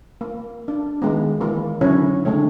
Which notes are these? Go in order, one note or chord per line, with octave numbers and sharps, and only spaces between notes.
A#3
D4
D#3 G#3 B3
E3 A#3
D3 F#3 C#4 E4 C#5
D3 G#3 A3 C#5